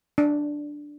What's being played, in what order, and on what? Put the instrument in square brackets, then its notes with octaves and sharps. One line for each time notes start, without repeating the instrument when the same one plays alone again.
[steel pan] D4